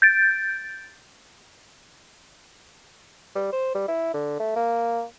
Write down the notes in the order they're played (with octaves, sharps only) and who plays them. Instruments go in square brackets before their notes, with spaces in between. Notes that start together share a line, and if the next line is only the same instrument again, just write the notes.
[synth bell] G6 A6 D7
[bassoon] G3
C5
G3
E4
D3
A3
A#3